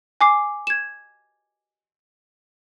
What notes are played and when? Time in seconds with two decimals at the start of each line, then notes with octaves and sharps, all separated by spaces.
0.21 G#5 D6 C7
0.67 G#6 E7